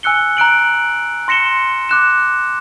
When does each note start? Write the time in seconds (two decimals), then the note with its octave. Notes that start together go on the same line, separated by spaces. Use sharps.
0.03 G#5 E6 F#6 C#7 G7
0.37 A#5 F#6 D7 F#7
1.28 C6 A#6 C#7 E7 G7
1.89 D6 F#6 E7